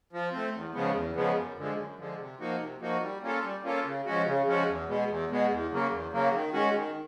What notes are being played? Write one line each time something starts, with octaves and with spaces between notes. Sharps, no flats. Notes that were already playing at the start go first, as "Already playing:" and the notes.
F3
A3 C4
E2
C#3 F3 G#3 B3
E2
C#3 F3 G#3 B3
F#2
D3 F3 G#3
F#2
D3 F3 G#3
C3
F3 A#3 D#4 F#4
C3
F3 A#3 D#4 F#4
G3
A#3 C#4 F4 A4
G3
A#3 C#4 F4 A4
C#3
F3 G#3 C#4 F#4
C#3
F3 G#3 C#4 F#4
E2
B2 G#3 B3
E2
B2 G#3 B3
E2
C#3 F#3 A#3
E2
C#3 F#3 A#3
D#3
G#3 C#4 F#4
D#3